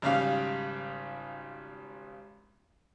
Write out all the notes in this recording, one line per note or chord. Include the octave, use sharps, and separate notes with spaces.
G#1 C#3 G3 F5